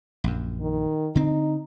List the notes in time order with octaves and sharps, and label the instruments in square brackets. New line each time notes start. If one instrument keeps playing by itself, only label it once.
[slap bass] A#1 F#2
[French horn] D#3
[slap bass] D3 C4 [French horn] D#4